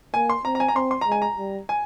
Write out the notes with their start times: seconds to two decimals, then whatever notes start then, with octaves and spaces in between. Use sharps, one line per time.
0.14 A#3 G#5
0.30 C6
0.45 C4 A#5
0.55 A#5
0.60 G#5
0.68 A#5
0.76 C4 C6
0.91 C6
1.01 A#5
1.07 G#3 G#5
1.22 A#5
1.38 G3
1.69 G#5